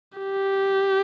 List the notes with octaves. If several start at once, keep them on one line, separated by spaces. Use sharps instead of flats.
G4